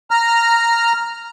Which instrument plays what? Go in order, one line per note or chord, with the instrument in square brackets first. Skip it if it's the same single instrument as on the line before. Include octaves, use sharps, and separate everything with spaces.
[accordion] A#5 F6